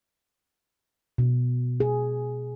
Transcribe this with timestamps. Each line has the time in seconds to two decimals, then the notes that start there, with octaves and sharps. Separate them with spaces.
1.18 B2
1.80 G#4